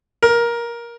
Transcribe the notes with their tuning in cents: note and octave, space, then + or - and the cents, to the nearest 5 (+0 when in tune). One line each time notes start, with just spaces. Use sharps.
A#4 +15